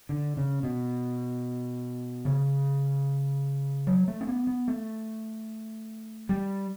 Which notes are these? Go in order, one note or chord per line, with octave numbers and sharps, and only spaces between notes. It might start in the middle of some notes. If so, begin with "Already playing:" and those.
D3
C#3
B2
C#3
F#3
A3
C#4
B3
B3
A3
G3